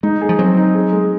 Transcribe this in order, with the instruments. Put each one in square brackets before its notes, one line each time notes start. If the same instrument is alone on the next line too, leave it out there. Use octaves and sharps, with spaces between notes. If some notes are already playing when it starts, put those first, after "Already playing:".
[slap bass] G#3 [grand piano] D#4
[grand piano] G#4
[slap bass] F3
[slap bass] F#3 [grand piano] C4
[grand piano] D#4
G#4
G#3